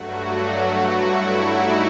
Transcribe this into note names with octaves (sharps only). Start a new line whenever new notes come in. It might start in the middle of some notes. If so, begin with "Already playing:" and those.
Already playing: G2 F#3 A3 F#4
F#4
E4
D#4